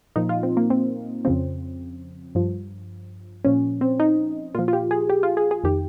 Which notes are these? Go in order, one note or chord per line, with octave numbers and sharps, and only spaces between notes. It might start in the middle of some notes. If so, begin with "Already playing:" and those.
A#2 F3 D#4
F4
C4
A#3
C4
F2 C#3 F3 C4
G2 F3
A#2 F3 C#4
C4
D#4
A#2 F3 F4
F4
G4
G#4
G4
F4
G#4
G#4
F2 D#3 G4